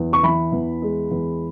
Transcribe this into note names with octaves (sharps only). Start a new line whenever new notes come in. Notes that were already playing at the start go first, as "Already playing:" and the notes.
Already playing: E2
C#6
E3 B5
E2
G#3
E2